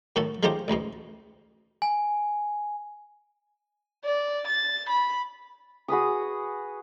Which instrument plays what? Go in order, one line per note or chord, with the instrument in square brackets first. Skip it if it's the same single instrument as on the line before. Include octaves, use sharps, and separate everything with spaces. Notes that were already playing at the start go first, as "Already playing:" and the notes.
[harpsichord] A2 D#3 A3 F#4 A4
G#3 A3 D#4 F4 G4 C5
A1 D2 G#2 B2
[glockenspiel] G#5
[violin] D5
A6
B5
[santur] F#4 G#4 B4 D#6